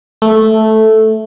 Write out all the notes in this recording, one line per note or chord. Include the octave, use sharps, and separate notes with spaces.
A3